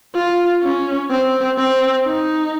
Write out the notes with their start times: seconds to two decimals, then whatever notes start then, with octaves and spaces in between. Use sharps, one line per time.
0.15 F4
0.63 C#4
1.11 C4
1.57 C4
2.06 D#4